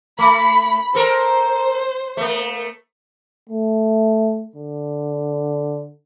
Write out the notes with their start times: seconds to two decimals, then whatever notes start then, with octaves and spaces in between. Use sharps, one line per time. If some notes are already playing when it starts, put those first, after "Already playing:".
0.19 A3 B5
0.95 A4 A#4 C5
2.17 A3 A#3
3.49 A3
4.55 D3